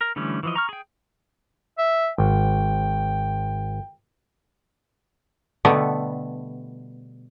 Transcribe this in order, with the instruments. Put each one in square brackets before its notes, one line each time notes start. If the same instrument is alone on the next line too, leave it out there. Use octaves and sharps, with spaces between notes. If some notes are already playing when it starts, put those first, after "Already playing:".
[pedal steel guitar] A#4
D3 E3 G3 A3 C#4
E3 F3 D#5
A#5 C#6 F6
G#4 G5
[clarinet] E5
[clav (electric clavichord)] G#1 [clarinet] G5
[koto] B2 D3 G3 A3 B3